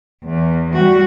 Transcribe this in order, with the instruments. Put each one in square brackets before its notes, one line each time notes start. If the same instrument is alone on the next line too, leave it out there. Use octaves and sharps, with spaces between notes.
[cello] E2
G3 F#4